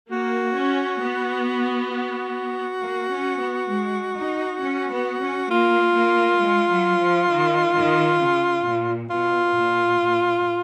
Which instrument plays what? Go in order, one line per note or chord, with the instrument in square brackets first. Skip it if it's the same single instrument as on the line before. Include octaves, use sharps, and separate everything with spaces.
[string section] A#3 [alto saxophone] F#4
[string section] C#4
B3
[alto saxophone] F#4
[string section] A#3
C#4
B3
G#3
D#4
C#4
B3
C#4
[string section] A#3 [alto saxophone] F4
[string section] A#3
G#3
F#3
F3
D#3
D#3
C#3
A#2
[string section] B2 [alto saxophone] F4
[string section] A#2
A#2